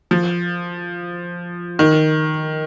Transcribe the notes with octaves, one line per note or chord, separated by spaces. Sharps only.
F3
D#3